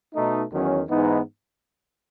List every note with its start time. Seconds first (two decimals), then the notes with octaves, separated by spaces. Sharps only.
0.14 B2 A3 D#4
0.51 E2 D#3 F#3 C#4
0.89 G#2 E3 B3 D#4